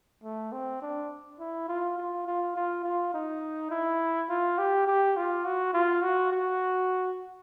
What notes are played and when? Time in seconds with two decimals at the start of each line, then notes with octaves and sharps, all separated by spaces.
0.24 A3
0.52 C4
0.82 D4
1.40 E4
1.69 F4
1.98 F4
2.27 F4
2.56 F4
2.84 F4
3.14 D#4
3.71 E4
4.29 F4
4.58 G4
4.88 G4
5.17 F4
5.45 F#4
5.74 F4
6.03 F#4
6.32 F#4